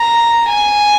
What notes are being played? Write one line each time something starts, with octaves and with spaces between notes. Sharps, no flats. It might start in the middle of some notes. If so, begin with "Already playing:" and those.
Already playing: A#5
G#5